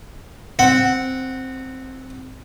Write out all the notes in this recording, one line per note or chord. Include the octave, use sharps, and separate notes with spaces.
C4 F#5